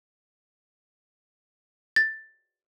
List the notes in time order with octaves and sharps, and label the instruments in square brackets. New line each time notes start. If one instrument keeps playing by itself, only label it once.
[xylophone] A6